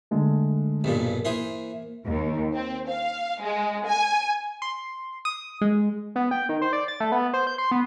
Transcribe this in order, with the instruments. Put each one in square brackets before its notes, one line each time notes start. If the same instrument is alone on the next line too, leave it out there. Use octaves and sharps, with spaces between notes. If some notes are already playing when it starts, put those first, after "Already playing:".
[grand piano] D3 G#3 A3
[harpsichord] B1 G2 A#2
[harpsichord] E3 G#4 C5 [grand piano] A#3
[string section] D#2
C4
F5
G#3
G#5
[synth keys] C6
D#6
G#3
[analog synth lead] B3
G5
D#3
C5
D5
A6
A3
B3
C5
G6
C6
B3